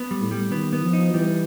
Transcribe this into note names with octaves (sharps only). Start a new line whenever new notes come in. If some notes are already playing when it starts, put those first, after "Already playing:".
Already playing: B3
G3
A2
G3
D#3 B3
B3
F3
D#4
E3 G3